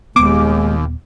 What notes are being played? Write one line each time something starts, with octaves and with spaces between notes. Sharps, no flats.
D#1 D#2 G#3 B3 D6